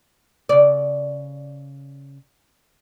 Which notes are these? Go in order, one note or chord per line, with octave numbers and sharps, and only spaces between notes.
C#3 D5